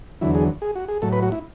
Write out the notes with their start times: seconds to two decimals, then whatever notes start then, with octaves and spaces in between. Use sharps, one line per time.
0.21 E2 D3 F#3 E4
0.35 G#4
0.62 G#4
0.75 F#4
0.88 G#4
1.02 A2 F#3 A4
1.13 B4
1.22 F#4
1.32 E4